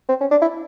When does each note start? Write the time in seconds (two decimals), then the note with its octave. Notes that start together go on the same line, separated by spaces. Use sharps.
0.09 C4
0.21 C#4
0.31 D4
0.42 E4